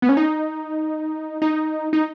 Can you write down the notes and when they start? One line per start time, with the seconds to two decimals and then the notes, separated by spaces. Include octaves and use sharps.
0.02 B3
0.09 C#4
0.17 D#4
1.42 D#4
1.93 D#4